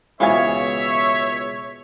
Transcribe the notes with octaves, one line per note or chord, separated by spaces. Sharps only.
C#2 B2 E3 C#5 E5 F5 G#5